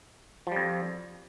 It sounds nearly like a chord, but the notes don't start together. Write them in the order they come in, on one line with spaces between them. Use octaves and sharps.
F3 G3 F2